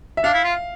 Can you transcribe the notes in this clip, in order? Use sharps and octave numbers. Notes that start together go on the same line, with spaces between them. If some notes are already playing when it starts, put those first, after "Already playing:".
E5
D4 F5
E4
F4